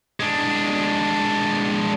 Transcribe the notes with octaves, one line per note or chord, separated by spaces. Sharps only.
G#3 D4